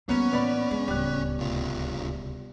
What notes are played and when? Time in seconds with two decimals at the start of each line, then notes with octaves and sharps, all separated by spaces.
0.09 F3 G3 A#3 B3 C#4
0.32 A2 E3 B4 D5 B5
0.71 G#3
0.88 D1 C#2 G3 F#6
1.39 C2 F4